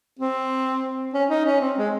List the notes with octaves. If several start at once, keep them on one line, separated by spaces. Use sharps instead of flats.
C4
C#4
D#4
C#4
C4
G#3